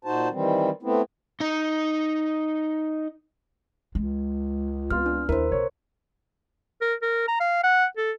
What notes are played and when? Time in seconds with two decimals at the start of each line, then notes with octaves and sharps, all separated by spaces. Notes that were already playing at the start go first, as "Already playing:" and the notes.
0.05 A#2 D#4 F#4 C5 A5
0.31 D#3 E3 G3 C4
0.83 A3 B3 C4 E4
1.40 D#4 D#5
3.95 C#2 G#3
4.91 B3 C4 F4 F6
5.06 D4
5.29 D#2 E4 A#4 C5
5.52 B1 C#5
6.81 A#4
7.02 A#4
7.28 A#5
7.40 F5
7.64 F#5
7.97 A4